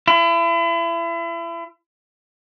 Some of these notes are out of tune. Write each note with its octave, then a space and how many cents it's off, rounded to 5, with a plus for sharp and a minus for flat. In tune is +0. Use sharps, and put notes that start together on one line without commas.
E4 +35